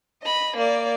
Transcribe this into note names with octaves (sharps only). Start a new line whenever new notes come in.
D#5 B5
A#3 D5